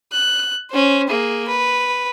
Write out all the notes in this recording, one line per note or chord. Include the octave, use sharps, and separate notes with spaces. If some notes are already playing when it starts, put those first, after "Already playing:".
F#6
C#4 C5
A#3 G#4
B4